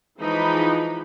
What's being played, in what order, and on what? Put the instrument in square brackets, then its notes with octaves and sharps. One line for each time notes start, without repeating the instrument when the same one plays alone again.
[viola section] E3 F3 G#3 D#4 B5